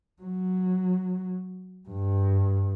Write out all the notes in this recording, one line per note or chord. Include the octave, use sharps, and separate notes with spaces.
F#3
G2